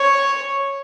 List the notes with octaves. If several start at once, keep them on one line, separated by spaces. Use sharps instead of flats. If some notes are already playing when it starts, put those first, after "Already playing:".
Already playing: C#5